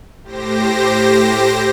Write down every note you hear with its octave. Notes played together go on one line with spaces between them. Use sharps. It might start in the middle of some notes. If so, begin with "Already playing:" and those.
A2 G4 C5 A#6